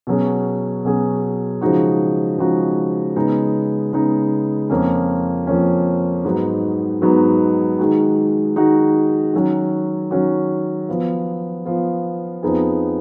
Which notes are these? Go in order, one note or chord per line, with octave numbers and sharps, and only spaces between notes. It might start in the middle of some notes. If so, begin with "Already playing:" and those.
B2 F#3 C#4 G#4
B2 F#3 C#4 G#4
C#3 F3 G#3 D#4 F#4
C#3 F3 G#3 D#4 F#4
C#3 G#3 B3 D#4
C#3 G#3 B3 D#4
F2 F3 A#3 C#4
F2 F3 A#3 C#4
G#2 F#3 B3 D#4 F#4
G#2 F#3 B3 D#4 F#4
D#3 G#3 D#4 F#4
D#3 G#3 D#4 F#4
D#3 F#3 C#4 F#4
D#3 F#3 C#4 F#4
F3 B3 F4
F3 B3 F4
F2 F3 B3 D#4 G#4